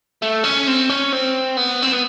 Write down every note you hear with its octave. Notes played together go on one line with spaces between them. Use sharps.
A3
C#4
C4
C#4
C4
B3
C4
B3